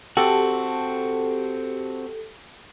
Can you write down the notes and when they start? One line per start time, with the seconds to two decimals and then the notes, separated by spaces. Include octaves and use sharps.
0.17 C4 F#4 G4 A4